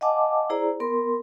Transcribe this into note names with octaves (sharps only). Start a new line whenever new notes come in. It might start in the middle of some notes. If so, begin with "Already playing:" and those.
D#5 F5 F#5 G#5 A5 D6
E4 G#4 C5 D5 A#5
B3 A#4 C6